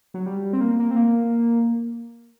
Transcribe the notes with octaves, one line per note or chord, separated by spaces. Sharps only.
F#3
G3
C4
A#3
A#3
C4
A#3